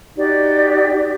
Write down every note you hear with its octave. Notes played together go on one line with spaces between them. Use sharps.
D#4 F#4 G4 D5